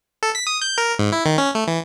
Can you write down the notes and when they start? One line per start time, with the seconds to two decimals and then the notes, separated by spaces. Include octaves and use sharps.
0.23 A4
0.35 B6
0.47 D#6
0.62 G6
0.78 A#4
0.99 G#2
1.13 E4
1.26 D#3
1.38 C#4
1.55 A3
1.67 E3